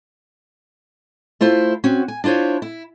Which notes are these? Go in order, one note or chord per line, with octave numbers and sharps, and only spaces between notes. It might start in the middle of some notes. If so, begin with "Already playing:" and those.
A3 E4 F4 C5
C4 C#4 F#4
G#5
D4 E4 F4 C5 C#5
E4